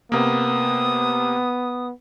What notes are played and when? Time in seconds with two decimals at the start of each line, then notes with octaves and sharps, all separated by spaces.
0.12 C3 A#3 B3 D#6